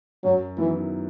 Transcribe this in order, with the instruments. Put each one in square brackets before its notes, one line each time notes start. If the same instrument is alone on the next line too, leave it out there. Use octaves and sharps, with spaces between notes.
[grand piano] F#2 [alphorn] F#3
[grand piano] D#3 F#3 B3 E4 [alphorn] E3